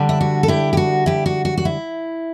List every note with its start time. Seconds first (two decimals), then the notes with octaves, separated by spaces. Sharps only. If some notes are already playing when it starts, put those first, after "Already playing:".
Already playing: D3 G3 D4
0.09 E4
0.21 F#4
0.43 A4
0.48 E4 G4
0.73 G4
0.77 F#4
1.06 E4 G4
1.26 F#4
1.45 F#4
1.57 F#4
1.65 E4